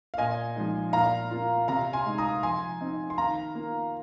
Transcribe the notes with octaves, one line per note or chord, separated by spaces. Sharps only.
F5
A#2 D#5 G#5
F3 G#3 D#4
A#2 F5 A#5
A#3 F4
C3 F5 A#5
G#5 C6
G#3 D#4
A#5 D#6
F3 G#5 C6
C4 D#4
C6
D#3 F5 A#5
A#3 F4